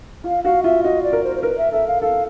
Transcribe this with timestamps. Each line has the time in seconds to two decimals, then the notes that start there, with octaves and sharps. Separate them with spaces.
0.24 F4 F5
0.44 F#4 F5
0.63 F4 E5
0.84 F#4 D#5
1.03 D5
1.13 A#4
1.24 C5
1.36 C5
1.43 A#4 B4
1.58 E5
1.72 A4 E5
1.87 F5
2.02 A4 F5